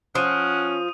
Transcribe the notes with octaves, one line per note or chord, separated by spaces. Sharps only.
F3 C#4 F#5 D#6 D#7